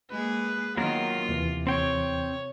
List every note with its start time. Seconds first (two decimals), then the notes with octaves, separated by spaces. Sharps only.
0.11 G#3 A#3 G#4 B4
0.77 D#3 F#3 A#3 B3 F4 A#4
1.29 D#2 C3 E3
1.67 C4 C#5 G5